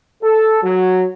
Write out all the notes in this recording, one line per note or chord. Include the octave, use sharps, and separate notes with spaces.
A4
F#3